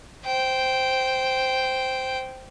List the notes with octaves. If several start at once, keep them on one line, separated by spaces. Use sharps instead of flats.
C5 G5